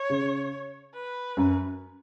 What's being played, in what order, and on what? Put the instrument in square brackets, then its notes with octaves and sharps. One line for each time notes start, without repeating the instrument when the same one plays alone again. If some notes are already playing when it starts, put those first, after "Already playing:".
Already playing: [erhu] C#5
[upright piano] C#3
[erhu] B4
[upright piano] F#2